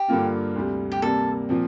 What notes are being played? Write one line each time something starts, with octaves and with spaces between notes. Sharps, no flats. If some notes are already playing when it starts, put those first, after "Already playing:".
Already playing: G4
G2 D3 G3 A#3 F4
D2 C3 G3
G4
C3 G3 A#3 A4
A#2 F3 C4